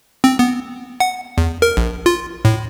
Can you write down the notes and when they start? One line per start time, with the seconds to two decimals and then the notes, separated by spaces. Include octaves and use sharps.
0.24 C4
0.39 B3
1.00 F#5
1.38 E2
1.62 A#4
1.77 A#1
2.06 F4
2.45 A2